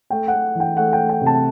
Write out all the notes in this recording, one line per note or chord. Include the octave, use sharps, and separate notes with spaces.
A3 G5
F#5
A3
E3 G5
A3 F#5
G5
A3
G5
C3
A5